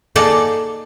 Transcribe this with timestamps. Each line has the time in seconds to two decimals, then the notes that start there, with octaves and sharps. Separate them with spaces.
0.16 A#3 D#4 G#4 A4 D5 A5